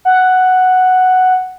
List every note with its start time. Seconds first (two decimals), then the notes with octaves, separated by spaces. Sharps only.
0.05 F#5